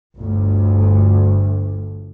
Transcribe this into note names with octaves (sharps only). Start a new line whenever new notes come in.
G1 D2